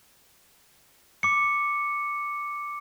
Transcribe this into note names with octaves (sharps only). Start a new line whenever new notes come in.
D6 C#7